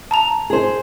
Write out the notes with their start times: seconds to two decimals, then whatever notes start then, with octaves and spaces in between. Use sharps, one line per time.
0.11 A5 A#5 F7
0.50 G#4 C5